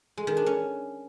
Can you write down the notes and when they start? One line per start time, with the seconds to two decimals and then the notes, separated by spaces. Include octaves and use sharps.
0.18 G#3
0.27 D#3
0.37 D4
0.46 C#4